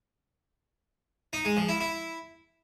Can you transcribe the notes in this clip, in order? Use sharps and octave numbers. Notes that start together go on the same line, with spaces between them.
D#4
G#3
F3
E4
E4